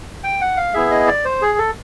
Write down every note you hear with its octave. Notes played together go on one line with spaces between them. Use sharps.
G5
F#5
F5
B3 E4 G#4 E5
D#5
D5
C5
G#4
A4